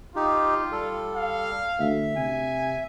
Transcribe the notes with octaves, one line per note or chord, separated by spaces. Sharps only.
D#4 F4 G4
G3 A4
F5
D2 E5
C3 G#5